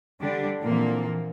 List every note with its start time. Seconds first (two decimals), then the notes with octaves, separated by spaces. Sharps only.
0.20 D3 G3 D4 G4
0.62 A#2 D3 E3 F3 A#3 C4